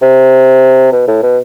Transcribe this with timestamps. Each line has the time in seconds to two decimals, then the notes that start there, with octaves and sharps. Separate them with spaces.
0.02 C3
0.92 B2
1.07 A2
1.22 B2